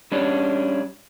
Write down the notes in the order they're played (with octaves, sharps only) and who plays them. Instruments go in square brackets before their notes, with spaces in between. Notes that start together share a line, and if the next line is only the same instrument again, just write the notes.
[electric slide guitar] G3 C#4 D4